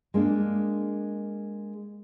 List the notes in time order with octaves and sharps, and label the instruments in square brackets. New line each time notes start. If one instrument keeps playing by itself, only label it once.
[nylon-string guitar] G#3 A#3 D4